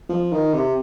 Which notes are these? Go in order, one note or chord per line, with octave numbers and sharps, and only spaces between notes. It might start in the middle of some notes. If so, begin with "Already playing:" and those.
F3
D#3
C3